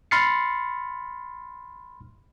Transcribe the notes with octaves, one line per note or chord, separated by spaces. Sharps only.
B5 C6 F6 A6 C7 C#7